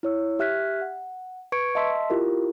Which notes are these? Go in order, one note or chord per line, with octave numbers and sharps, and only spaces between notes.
E4 C#5 E6
G4 E5 F6 F#6 G#6 B6
F#5
B4 C#6 G#6 C#7 D7
D#5 E5 A5 C6 E6 B6
E4 F4 G4 A#4